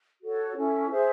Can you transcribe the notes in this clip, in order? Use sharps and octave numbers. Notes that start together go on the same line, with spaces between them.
F#4 A4 C#5
C#4 E4 A4
G#4 C5 E5